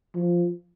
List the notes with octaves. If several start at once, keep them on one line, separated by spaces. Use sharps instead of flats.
F3